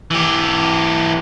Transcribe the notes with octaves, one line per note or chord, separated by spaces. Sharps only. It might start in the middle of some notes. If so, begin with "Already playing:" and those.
E3 G4